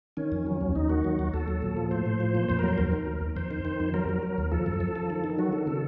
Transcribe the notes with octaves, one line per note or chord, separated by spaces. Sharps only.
D#3 C#4
F2
F#3
D#2
D#2 D#4
D#3 F#4
F#3
D#2
D#2 A4
F#3
A#2
F3
A2 C5
A2
F3
A#2
F2 C5
A#4
F#3 C5
D#2 A#4
D#3
D#2
D#2
F2 C5
D#3
D#3
F2
F#3 A#4
F#3
F#3
D#2
F3 A4
F#2
F3
F3
D#3
D#3
F#3 F#4
D#3 A4
C#3 A4